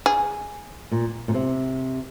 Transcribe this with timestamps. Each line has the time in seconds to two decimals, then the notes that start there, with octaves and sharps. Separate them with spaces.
0.06 G#4
0.91 A#2
1.28 A#2
1.34 C3